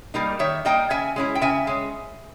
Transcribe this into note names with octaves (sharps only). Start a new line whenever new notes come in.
G3 A#3 D#4
D#3 C#5 E5
G3 A#3 D#4 D#5 G5
C#3 E5 G#5
G#3 C#4 E4
G5
C#3 E5 G#5
G#3 C#4